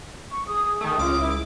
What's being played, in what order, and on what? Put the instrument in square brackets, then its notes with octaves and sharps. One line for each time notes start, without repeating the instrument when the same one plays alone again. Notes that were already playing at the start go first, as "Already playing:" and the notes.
[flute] C#6
[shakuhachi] G#4 [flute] D#6
[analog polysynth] D#3 A3 [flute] D#6
[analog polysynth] C#2 D6 [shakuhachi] F4
[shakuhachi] E4